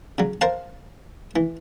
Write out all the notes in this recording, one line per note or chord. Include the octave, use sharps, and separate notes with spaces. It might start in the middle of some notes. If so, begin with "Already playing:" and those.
C#3 F#3
A#4 C5 F5 A5
E3